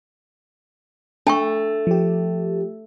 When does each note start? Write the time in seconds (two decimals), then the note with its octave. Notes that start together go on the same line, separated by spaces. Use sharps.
1.27 A3 D4 G5 C#6
1.87 F3 G4